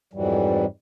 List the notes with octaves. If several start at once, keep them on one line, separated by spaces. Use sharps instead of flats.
F2 G#2 E3 F#3 G3